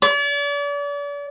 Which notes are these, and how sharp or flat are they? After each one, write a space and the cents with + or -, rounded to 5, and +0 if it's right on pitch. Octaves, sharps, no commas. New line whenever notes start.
D5 -40